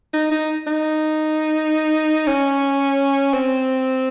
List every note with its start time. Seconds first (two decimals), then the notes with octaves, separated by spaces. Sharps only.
0.13 D#4
0.31 D#4
0.67 D#4
2.27 C#4
3.34 C4